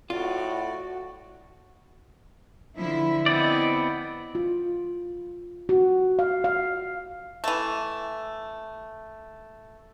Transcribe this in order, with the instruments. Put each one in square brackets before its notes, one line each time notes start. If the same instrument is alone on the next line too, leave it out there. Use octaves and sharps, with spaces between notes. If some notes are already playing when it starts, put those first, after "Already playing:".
[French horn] A2 [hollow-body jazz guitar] F4 [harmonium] F#4 [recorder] D5
[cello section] D3 F3 E4
[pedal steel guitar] B3 C4 D5 [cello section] E4 D#5
[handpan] F4
F#4
F5
F5
[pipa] E3 A3